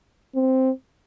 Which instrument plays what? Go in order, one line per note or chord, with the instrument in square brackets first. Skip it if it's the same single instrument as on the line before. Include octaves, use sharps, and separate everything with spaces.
[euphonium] C4